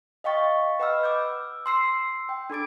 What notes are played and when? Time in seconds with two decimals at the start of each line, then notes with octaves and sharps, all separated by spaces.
0.24 D#5 F5 G5 C#6 A6
0.79 B4 D#5 F#5 B5 E6 F6
1.03 D6 E6 G6
1.66 C6 E6 C7
2.29 G5
2.50 D4 A4 B5 D6 A6 D7